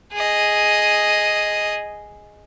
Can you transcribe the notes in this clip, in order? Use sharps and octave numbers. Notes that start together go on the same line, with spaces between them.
G#4 D#5